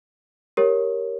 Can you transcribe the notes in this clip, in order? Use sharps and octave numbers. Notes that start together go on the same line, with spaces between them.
G4 A#4 C#5